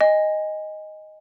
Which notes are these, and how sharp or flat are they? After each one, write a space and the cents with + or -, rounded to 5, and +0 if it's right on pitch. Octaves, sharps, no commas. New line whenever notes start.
D#5 +0 G#5 -20